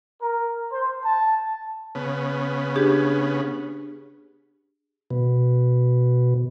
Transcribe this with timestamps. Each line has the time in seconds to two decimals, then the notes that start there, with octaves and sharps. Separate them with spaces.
0.20 A#4
0.70 C5
1.03 A5
1.95 C#3 B3
2.76 D4 G4 G#4
5.11 B2